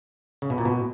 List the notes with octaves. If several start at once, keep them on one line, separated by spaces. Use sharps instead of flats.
C#3
B2
A#2
B2